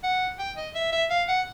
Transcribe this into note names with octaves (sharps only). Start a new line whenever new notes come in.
F#5
G5
D#5
E5
E5
F5
F#5